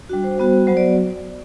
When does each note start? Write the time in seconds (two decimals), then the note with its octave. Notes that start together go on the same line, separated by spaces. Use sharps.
0.09 G3 D4 F#4
0.24 C5
0.38 G3 B3 F#4
0.67 F#3 B3 F#4 C5
0.77 D5